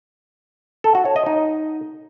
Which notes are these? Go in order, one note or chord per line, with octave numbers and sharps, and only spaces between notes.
A4
F#4
C#5
D#5
D#4